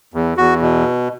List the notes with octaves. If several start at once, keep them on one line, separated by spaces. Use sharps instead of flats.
E2
E2 F#4
B2